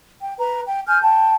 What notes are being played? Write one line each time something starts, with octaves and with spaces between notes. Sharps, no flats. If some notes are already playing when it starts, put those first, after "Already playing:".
G5
B4 A#5
G5
G#5 F6 G6
G5 A5